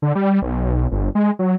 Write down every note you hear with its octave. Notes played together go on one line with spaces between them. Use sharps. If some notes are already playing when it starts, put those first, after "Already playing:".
D3
G3
B1
G1
G#3
F#3